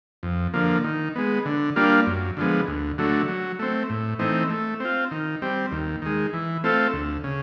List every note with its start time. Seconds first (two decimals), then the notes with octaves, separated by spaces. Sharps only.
0.23 F2
0.54 D3 F3 A#3
0.84 D#3
1.16 G#3 B3
1.46 D3
1.76 G3 A#3 D4 F4
2.07 F#2
2.37 D3 F3 G#3 B3
2.68 D2
2.98 D3 F#3 A3
3.28 F#3
3.59 A3 C4
3.90 A2
4.19 E3 A3 C4 D#4
4.50 A3
4.80 C4 F4
5.11 D#3
5.42 G3 C4
5.72 D#2
6.02 D#3 G#3
6.33 E3
6.64 A3 C4 F4 A4
6.93 D2
7.24 C#3